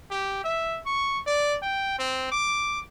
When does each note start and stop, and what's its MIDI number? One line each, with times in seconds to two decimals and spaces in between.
0.11 0.42 67
0.44 0.80 76
0.86 1.20 85
1.26 1.56 74
1.62 1.94 79
1.99 2.31 60
2.31 2.80 86